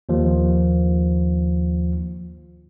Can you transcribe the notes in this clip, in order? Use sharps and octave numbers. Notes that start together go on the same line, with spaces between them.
D#2 F3